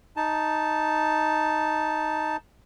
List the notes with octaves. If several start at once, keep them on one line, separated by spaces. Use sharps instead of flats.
D#4 A5